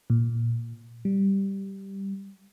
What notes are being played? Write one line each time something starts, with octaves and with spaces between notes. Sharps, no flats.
A#2
G3